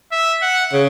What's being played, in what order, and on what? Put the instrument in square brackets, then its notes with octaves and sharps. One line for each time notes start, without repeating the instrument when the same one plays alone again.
[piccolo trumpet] E5
F#5
[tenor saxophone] C#3